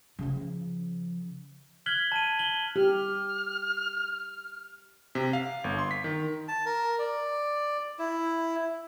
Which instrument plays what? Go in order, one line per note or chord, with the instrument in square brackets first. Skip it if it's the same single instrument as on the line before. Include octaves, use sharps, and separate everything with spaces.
[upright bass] C#3 F3
[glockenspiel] F6 F#6 G#6 B6 F#7 G7
A5 D#7
F#7 G7
[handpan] G4 [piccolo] F6
[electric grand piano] C3
F5
G1
C6
B6
D#3
[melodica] A5
A#4
D5
E4